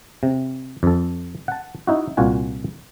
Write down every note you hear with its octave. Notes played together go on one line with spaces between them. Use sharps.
C3
F2 A4
F#5 A5
D#4 E4 F#4
C2 A#2 F4 F#4 G#5